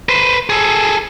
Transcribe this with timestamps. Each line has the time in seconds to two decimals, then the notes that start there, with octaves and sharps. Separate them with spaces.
0.09 B4 C5
0.50 G#4 A4